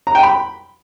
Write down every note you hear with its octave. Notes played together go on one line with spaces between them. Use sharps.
A#5
G5
B5